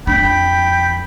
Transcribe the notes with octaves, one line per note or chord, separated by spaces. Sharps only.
F2 D4 G5 B5